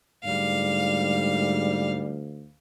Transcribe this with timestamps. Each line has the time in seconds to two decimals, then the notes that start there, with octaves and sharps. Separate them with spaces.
0.25 D2 G#2 G3 F5